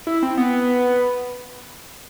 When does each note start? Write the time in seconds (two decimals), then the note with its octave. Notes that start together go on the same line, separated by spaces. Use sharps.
0.07 E4
0.23 C4
0.37 B3